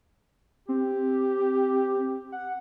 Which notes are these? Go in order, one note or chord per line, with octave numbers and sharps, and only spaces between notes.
C4 G4
F#5